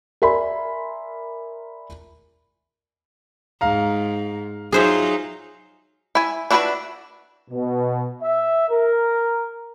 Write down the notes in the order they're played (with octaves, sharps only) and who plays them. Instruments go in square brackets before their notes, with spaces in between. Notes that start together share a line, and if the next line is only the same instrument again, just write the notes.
[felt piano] A#4 D5 E5 G#5 B5 C6
[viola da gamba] G#2 [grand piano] F5 A#5
[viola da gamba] F#3 D#4 F4 [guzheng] G#4 C5 E5
[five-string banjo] E4 G#5
D4 E4 F#4 A4 B4
[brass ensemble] B2
E5
A#4